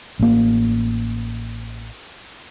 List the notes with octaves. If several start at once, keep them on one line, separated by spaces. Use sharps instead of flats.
A1 A#3